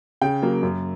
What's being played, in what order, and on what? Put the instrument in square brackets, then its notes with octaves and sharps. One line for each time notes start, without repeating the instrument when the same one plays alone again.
[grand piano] C#3 G5
F#3 A#3
F#2